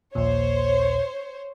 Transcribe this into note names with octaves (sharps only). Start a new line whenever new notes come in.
A#1 D#2 A#2 C5 C#5